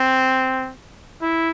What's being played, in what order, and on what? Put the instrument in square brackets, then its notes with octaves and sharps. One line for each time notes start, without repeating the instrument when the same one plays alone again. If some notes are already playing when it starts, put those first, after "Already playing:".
Already playing: [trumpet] C4
E4